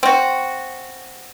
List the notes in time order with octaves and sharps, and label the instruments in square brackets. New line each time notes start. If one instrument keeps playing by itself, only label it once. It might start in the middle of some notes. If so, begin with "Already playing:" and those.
[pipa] C4 F#4